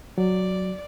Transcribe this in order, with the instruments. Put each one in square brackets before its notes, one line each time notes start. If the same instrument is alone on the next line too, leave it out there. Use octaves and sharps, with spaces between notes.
[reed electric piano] F#3 [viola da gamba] D5